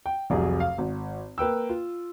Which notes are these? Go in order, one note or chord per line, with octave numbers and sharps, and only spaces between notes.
G5
F1 C2 F#3 G#4
F5
G#1
A#3 B4 G5 E6
F4